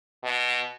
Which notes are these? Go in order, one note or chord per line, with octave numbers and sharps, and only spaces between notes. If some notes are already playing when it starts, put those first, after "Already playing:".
B2